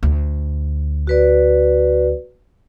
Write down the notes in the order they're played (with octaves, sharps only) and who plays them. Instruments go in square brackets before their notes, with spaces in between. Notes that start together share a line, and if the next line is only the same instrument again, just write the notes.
[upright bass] D2
[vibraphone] F#4 B4 D5